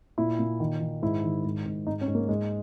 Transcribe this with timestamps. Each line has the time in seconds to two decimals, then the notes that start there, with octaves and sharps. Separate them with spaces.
0.18 A#2 E4
0.39 A#2
0.60 D#3
0.81 D#3
1.02 G#2 E4
1.23 D#3
1.45 G#2
1.66 G#2
1.87 G#2 D#4
2.01 C#4
2.08 G#2
2.15 A#3
2.29 G#2 G#3